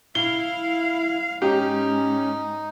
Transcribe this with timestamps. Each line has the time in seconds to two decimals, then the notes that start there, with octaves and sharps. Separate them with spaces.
0.15 E4 F5 G7
1.42 G#2 C#4 D#4 G4